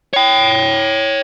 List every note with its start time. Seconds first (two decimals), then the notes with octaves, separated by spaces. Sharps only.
0.13 C#5 G5